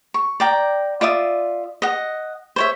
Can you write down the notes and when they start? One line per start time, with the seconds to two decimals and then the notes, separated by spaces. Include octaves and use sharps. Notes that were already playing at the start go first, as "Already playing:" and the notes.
0.14 C#6
0.40 D5 G5 A#5
1.01 F4 D5 E5 D#6
1.82 D#5 F#5
2.56 C5 C#5 E5